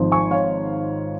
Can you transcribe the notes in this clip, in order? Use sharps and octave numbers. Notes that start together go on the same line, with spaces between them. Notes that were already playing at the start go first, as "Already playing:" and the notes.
Already playing: G#1 G#2 F3
G#5 C#6
C#5 F5